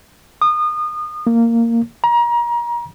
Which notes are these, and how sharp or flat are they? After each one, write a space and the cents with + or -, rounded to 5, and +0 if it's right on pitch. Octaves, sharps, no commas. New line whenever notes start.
D#6 -30
A#3 -10
A#5 +30